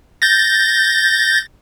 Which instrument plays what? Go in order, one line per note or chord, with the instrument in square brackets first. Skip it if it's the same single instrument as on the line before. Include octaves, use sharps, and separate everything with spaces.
[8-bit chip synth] G6 A6 A#6